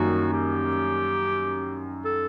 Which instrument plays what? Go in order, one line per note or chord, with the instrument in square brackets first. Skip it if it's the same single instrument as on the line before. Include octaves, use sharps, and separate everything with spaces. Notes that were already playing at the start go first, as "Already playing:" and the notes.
Already playing: [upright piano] F#2 D#3 G3 A#3 [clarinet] F#4
[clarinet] G4
A4